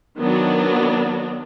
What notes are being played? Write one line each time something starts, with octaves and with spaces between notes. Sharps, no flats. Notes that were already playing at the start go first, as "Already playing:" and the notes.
D#3 F#3 B3 D4